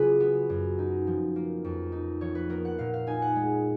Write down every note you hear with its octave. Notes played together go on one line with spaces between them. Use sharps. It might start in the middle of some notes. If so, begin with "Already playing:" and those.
Already playing: C#3 F#3 F4 G#4 B4
B3
F#2
D#4
F3
A#3
F2
D#4
F3 C#5
B4
B3 A#4
F#5
A#2 F5
F5
D#4 G#5
F#5
G#3